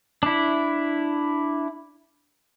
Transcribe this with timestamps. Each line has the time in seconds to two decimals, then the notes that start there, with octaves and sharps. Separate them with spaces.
0.23 D4 E4